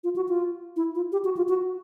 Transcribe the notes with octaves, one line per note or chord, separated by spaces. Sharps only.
F4
F#4
F4
E4
F4
G4
F#4
F4
F#4